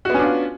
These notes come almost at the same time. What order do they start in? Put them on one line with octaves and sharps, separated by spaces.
F#4 B3 C#4 D4 F4